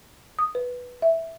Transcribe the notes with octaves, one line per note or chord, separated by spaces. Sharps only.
D#6
B4
E5